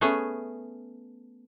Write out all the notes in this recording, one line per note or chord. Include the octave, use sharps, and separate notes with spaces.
A3 B3 C#4 G#4